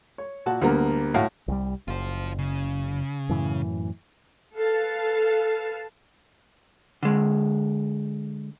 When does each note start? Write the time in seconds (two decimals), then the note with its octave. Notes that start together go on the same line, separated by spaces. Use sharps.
0.18 C#5
0.46 A#2 F#4 A5
0.61 D2 G3 A#3 B3 A#5
1.14 A2 E4 F#4 F5
1.48 C2 G3
1.88 F#1 F4 C5
2.39 C#3
3.29 F#2 A2 E3
4.55 A4 B4 F5 A5
7.03 D3 G#3